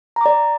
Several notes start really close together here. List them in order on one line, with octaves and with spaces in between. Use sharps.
A#5 D6 D5